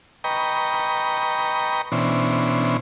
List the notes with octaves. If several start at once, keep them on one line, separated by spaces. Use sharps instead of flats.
B4 D#5 G5 A#5 C#6
B2 E3 C#4 D4 C5